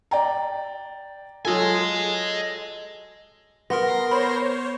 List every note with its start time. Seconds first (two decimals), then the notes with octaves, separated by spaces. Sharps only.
0.11 D5 G5 A#5
1.45 F#3 F4 A4 D#5 G#5
3.70 B3 A#4 C6 A#6
4.11 C5 C#5 B5